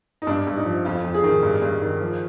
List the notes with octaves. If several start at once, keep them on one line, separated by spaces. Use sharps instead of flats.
D#4
G2 D4
G2
D#4
F3
F2 F4
F2
G#4
D#3
G2
G2
D#3
F3